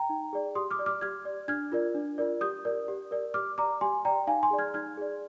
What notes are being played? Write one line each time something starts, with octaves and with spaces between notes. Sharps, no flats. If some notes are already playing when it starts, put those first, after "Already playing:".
Already playing: G5 A#5
D#4
G#4 D5
G4 C6 D#6
D6 F6
D5
D6 F6
G4 F6 G#6
D5
D4 F6 G#6
F4 A#4 D5
D4
F4 A#4 D5
G4 D#6 G6
A#4 D5
G4
A#4 D5
G4 D6 F6
D5 A#5 D6
G4 G#5 C6
D5 G5 A#5
D#4 F5 G#5
G#5 C6
G#4 D5
F6 G#6
D#4 F6 G#6
G#4 D5